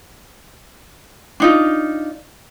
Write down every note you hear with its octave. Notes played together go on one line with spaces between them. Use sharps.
D4 D#4 F4